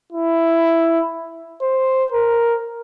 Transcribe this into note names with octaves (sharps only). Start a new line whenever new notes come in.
E4
C5
A#4